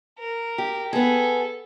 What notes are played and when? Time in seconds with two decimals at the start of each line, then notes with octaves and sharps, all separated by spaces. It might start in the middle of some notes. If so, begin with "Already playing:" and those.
0.19 A#4
0.58 G4
0.93 B3 G#4 A4